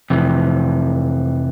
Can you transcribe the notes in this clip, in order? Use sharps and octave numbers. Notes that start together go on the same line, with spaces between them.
F2 C3 E3